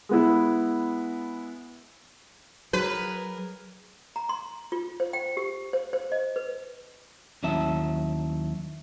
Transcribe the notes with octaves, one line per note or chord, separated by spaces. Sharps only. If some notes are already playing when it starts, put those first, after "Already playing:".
G#3 B3 E4
F#3 G#4 A#4 B4
A#5
C6
F4
C5
G5
G4
C5
C5
D#5
B4
D#2 F#3 C#4 E4 E5 A5